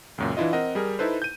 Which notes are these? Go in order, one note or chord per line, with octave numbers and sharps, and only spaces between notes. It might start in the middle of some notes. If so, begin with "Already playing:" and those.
C#2 F#2 A#2
E3 D4 E4 F4 D#5
C4 A#4 D#5 F#5
G3 G#4 A#4
D#4 E4 A4 B4 C5
G6 D#7